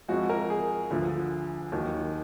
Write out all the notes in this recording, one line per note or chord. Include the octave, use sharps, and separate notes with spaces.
F2 F3 G#3 F#4
A#4
G#4
D2 D3 F3
D#2 D#3 F#3